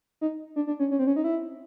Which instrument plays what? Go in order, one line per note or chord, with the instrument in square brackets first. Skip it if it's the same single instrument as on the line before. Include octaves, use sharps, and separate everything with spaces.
[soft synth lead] D#4
D4
D4
C#4
C#4
C4
C#4
D#4
E4